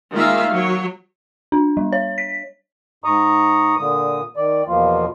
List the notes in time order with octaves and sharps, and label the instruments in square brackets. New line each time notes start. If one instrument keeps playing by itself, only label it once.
[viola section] D#3 G#3 A#3 F4 E5 F5
F#3 C#5
[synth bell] D4
G3
C#5
B6
[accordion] G#2 A#5 C#6 D#6
A#2 D3 D#6
D#3 D5
E2 B2 F3 A#3 F4